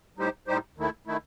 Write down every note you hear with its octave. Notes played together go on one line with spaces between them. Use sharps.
A2 G3 D#4 G4 C5
A2 G3 D#4 G4 C5
D#2 D#3 A3 E4
D#3 A3 E4